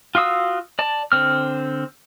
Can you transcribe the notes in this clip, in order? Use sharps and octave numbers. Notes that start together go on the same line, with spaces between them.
F4 F#4 F5 D#6 E6
D5 A5
D3 C4 F6